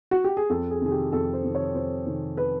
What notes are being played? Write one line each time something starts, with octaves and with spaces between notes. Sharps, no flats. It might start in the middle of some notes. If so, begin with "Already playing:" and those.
F#4
G4
G#4
F2 A4
G#4
C3 D#3 G#4
G4
F2 A4
C5
C3 D#3
C#5
F2 C5
C3 D#3
B4